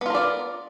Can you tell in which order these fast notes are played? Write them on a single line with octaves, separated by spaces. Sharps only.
B3 F4 A#4 D5